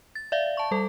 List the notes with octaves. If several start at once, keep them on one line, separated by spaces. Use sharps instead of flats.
A6
D5 E5 F5
A5 C#6
G3 A4